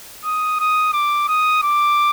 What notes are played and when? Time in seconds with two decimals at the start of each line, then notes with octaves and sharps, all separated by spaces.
0.25 D#6
0.60 D#6
0.93 D6
1.28 D#6
1.63 D6